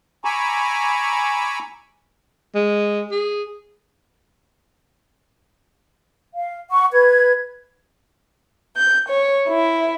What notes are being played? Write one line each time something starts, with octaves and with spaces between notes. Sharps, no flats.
G#5 A#5 B5 C#6 D6 E6
G#3
G#4
F5
F#5 C#6
B4 G#6
G6
C#5
E4